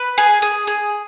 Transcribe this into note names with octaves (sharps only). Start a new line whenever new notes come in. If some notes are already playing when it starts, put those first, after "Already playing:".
Already playing: B4
G#4
G#4
G#4